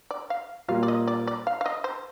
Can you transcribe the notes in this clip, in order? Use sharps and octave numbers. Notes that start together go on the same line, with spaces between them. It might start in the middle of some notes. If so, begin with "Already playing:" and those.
D5
F5
A#2 G3 A#3 F4 F5
D5
D#5
D5
D5
F5
F5
D#5
C5